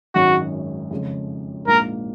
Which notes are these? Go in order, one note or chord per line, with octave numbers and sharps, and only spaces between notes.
G#1 F#2 D#3 G#3 C#4 F#4
F2 C#3 F3 G#3
A#1 G#2 F3 A#3 A#4